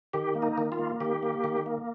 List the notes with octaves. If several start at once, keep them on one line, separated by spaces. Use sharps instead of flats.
D#3 G4
A#3
D#4
D#3
F4
A#3
D#3 G4
A#3
D#3
A#3